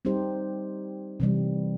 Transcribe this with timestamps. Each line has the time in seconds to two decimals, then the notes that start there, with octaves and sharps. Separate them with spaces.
0.05 G3 C4 D#4 G4 C5
1.20 C3 E3 G3